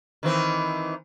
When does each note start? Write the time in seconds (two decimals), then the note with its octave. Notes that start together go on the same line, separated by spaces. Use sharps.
0.23 D#3 E3 C4